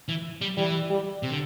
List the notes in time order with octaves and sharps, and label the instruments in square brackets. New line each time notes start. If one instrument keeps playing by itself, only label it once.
[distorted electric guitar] E3
G3
[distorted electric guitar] E3 [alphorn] G3
[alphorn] G3
[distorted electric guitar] C3
D3